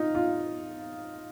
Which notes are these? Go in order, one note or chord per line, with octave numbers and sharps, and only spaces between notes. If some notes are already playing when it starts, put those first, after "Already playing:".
Already playing: D#4 F4
F4